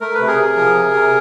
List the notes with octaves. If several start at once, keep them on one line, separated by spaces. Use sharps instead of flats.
A3 A#4
B4
C3
G#4 A#4
C3
F3
C3
C3